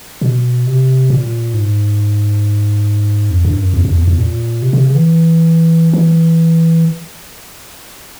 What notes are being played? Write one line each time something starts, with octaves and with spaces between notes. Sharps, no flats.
B2
C3
A#2
G#2
F2
G2
F#2
E2
F2
E2
E2
A#2
C3
C3
C#3
E3
E3